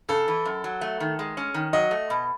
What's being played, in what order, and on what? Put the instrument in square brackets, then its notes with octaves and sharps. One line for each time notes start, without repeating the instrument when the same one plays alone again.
[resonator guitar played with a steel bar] C#3 [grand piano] A4
[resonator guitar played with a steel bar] E3
F#2
F#3
A3
D#3
G#3
C#4
D#3
[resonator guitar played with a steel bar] F#3 [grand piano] D#5
[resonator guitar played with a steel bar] A3
B2